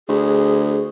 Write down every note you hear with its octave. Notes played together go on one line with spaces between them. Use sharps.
D2 G#4